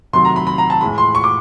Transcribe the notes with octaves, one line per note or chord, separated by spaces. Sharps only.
C3 D#3 F#3 A3 C6
A#5
B5
B5
A#5
A5
A2 E3 G#3 B5
C6
C#6
D6